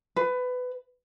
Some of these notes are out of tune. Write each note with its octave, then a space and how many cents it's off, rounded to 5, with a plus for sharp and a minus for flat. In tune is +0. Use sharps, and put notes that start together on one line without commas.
B4 +20